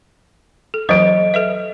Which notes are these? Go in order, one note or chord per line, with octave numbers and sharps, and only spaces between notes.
A4
E3 F#3 B4 D#5 D7
A4 B4 E5